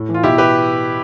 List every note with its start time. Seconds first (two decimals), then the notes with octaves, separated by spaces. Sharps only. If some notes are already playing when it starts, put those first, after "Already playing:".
Already playing: A2
0.09 E3
0.14 F4
0.23 B2 E4 G4
0.38 G4 B4